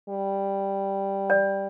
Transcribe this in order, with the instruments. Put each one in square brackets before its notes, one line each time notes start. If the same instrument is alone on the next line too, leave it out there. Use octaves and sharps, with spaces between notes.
[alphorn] G3
[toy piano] D5